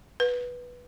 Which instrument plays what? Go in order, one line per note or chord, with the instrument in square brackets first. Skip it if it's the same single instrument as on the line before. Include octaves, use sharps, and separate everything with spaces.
[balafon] B4